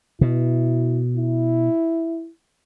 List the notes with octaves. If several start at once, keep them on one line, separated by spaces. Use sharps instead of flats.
B2 E4
E4